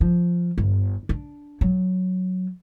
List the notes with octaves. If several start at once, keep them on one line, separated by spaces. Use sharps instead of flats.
F3
G1
D4
F#3